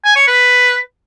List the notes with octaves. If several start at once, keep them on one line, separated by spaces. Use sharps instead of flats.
G#5
C#5
B4